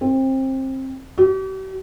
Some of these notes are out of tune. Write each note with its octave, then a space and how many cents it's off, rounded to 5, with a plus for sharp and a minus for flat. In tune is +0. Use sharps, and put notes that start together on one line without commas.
C4 +25
G4 -45